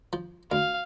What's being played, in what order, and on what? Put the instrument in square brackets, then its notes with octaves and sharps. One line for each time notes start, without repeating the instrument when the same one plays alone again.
[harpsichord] F3
[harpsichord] D2 [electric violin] F5